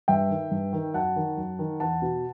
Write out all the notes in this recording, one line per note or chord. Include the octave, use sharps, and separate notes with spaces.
G2 E5 G5
D#3
G2
D#3
F#2 F#5 A5
D#3
F#2
D#3
E2 F#5 A5
B2